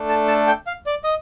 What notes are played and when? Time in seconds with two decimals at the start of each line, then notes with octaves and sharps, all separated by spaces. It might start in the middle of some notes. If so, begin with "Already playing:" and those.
Already playing: A3 D4 A4
0.09 A5
0.28 A5
0.47 G5
0.67 F5
0.86 D5
1.04 D#5